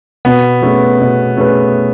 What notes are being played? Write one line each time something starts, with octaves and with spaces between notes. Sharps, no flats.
B2 B3
A3 C#4 G#4 B4
B2
A3 C#4 G#4 B4